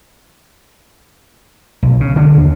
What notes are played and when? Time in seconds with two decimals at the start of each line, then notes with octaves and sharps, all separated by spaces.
1.83 B1
2.00 C#3
2.16 D3 D4
2.37 D#2